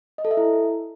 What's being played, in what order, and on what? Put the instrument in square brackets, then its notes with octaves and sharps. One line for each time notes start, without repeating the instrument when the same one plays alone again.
[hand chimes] D#5
A4
E5
E4